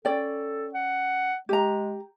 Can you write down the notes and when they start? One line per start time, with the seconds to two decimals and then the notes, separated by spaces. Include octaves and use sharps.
0.05 C#4 A4 D5 G5
0.74 F#5
1.49 G#3 G4 A#5